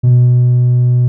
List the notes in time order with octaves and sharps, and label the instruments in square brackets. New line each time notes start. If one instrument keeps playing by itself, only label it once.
[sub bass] B2